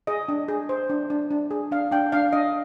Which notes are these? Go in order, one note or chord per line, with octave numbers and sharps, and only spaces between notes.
G#4 D#5
D4
G#4
C5
D4
D4
D4
G#4
D4 F5
D4 G5
D4 F5
D4 D#5